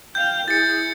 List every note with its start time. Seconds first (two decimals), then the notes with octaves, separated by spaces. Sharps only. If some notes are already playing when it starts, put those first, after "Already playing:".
0.15 F5 G5 G6
0.48 E4 G#4 A6 C#7